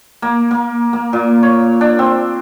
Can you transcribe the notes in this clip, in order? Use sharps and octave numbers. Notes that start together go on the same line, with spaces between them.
A#3
A#3
A#3
A#2
C#5
D4
C4